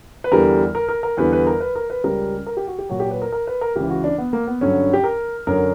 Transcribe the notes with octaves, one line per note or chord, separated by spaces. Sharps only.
B4
E2 D3 G3 A#4
A#4
A#4
A#4
E2 D3 G3 B4
B4
A#4
B4
A#4
B4
C#2 C#3 G3 A#4
A#4
G4
F#4
G4
A#2 F#3 F#4
G4
B4
A#4
A#4
B4
A#4
C#2 C#3 E3 G4
F#4
D4
B3
A#3
B3
G2 D3 F#3 C#4
G4
A#4
F#2 D3 F#3 A#4